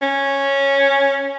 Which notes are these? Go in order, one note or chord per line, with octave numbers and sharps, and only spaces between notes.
C#4